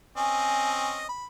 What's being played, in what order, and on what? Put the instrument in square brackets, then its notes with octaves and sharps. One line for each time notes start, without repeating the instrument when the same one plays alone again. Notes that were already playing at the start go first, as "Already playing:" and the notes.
[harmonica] C4 C#4 D#5 [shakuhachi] G#5
[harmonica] B5